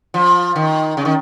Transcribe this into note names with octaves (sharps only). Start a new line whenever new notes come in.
F3
D#3
C#3
D#3